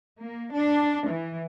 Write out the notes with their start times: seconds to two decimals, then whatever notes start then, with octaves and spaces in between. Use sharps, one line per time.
0.20 A#3
0.52 D4
1.08 E3